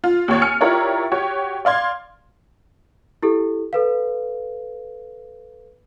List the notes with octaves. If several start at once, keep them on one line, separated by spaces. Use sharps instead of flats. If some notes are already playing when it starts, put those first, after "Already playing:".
F4
D#2 G4 C#5 A6
G#5 F6 C#7
E4 F4 G4 A#4 C#5 D5
F#4 G4 C#5
D5 F5 C6 G#6
E4 G4 A4
A4 B4 F5